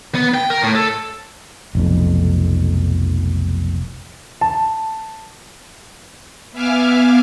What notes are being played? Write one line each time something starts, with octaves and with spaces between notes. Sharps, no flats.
B3
G5
A#4
A2
A4
F1 B1 F2
A5
B3 E5 F5 G#5 D6 F6